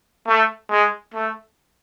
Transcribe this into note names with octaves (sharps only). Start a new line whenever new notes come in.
A3
G#3
A3